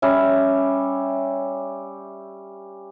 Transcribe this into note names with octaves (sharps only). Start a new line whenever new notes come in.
G3 C#4 E5